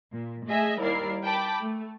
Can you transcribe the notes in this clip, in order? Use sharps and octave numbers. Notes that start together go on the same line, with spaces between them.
A#2
A3 G#4 D#5 E5 G#5
D#2 G3 E4 A#4 D5 C7
G5 A5 B5 D6
A3